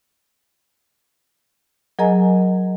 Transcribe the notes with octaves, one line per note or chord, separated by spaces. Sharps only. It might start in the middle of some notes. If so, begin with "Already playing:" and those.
F#3 G#4 A#4 D#5 G#5 A#5